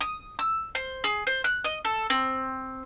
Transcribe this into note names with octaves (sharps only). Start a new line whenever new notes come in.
D#6
E6
C5
G#4
C5
F#6
D#5
A4
C4